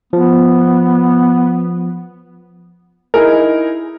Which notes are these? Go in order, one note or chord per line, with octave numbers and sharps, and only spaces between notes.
F3 B3
D#4 E4 G#4 A#4